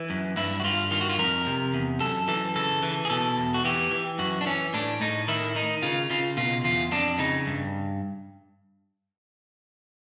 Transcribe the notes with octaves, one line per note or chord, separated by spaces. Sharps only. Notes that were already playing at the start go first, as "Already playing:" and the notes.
Already playing: E3
F#2
G2 E4
F#4
G2 F4
D#3 F4
F#4
F4
F2 A#4
C3
E2
F#2 A4
E3 A4
C#3 A4
E3
G#4
B2 A4
E2
F#4
E3 G4
E3
F#2 F#4
D4
E3 C#4
A2 D4
A2 D#4
D#3 E4
D#3 D#4
C#3 F4
C#3 F4
B2 F4
E2 F4
F2 D4
C#3 D#4
G2